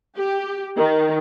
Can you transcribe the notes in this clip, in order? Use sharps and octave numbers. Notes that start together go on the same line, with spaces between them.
G4
D#3